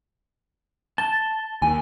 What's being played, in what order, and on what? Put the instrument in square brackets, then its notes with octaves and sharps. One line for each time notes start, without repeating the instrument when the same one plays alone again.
[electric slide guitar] A5 [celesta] A6 [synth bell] G7
[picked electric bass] D#2 [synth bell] G#5